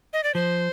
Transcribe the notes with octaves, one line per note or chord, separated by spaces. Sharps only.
D#5
D5
F3 C5